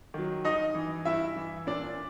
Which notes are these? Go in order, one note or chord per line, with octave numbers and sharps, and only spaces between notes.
D#3 F#3
G2 D#4 D#5
E3
G2 E4 E5
E3
A#2 D4 D5